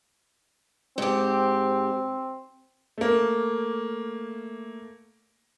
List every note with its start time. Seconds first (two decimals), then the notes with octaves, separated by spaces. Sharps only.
0.98 G#2 C4 G4
2.98 A3 A#3